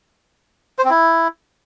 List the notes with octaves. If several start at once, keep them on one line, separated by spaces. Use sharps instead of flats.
C5
C4
E4